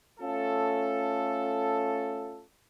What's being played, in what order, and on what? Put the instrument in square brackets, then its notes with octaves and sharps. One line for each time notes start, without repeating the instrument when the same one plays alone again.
[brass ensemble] A3 C#4 F4 A4